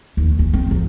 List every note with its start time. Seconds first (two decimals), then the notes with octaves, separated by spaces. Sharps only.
0.17 D#2
0.39 C#4
0.53 C4
0.71 F3